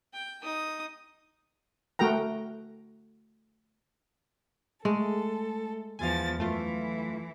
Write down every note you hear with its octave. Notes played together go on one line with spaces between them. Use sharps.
G5
D#4 D#6
A3 F#4 A#4 G5 A#5
G#3 A3 A4
E2 F3 F5 G#5 A6
F#2 E3 A3 F4